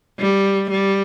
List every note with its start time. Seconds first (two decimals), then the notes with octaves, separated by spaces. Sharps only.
0.19 G3
0.71 G3